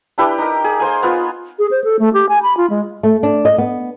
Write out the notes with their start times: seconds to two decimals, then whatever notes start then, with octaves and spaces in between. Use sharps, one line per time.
0.18 D4 E4 G4 B4
0.39 D#4 A#4
0.64 G#4
0.80 A#3 C5 G#5
1.03 B3 F4
1.59 G#4
1.71 C5
1.84 A4
1.99 A3
2.13 G4
2.29 G#5
2.43 B5
2.57 F4
2.70 G#3
3.03 A3
3.23 D4
3.45 D#5
3.58 B3